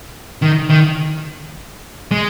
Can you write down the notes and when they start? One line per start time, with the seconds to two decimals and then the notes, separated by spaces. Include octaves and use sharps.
0.42 D#3
0.70 D#3
2.11 G#3